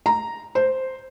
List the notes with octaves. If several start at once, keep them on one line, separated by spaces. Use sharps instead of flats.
A#5
C5